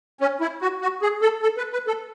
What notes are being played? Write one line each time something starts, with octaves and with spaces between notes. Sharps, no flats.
C#4
E4
F#4
F#4
G#4
A4
A4
B4
B4
A4